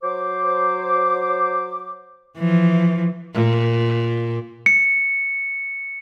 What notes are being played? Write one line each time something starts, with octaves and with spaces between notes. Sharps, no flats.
F#3 C5 D6
E3 F3
A#2
C#7